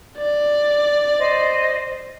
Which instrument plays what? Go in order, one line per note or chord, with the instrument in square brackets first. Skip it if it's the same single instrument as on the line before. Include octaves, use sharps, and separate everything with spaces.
[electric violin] D5
[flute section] C5 D#5